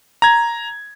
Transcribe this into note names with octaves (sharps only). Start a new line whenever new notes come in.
A#5 G#6